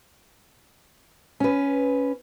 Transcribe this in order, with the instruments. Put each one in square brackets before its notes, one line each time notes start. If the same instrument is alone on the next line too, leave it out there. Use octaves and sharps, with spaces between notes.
[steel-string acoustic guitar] C#4 B4